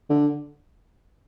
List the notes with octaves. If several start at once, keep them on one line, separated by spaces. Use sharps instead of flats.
D3